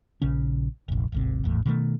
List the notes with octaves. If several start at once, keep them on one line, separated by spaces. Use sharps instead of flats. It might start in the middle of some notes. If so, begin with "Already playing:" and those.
A#1 C#3 C#4
F1 A#1
D1 G#1 C3
G#1 E2 A2
B2 D#3 A3